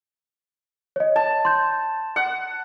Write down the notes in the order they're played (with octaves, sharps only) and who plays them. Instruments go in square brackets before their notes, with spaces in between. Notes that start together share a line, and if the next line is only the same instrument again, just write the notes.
[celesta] C#5 D#5
[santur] A5
[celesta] C6 G6
[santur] F#5